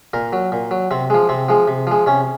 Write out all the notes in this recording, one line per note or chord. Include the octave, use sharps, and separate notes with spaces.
A#2 A#4
F#3
A#2
F#3
C3 C4
F3 G#3
C3 C4
F3 G#3
C3
F3 G#3
C3 C#4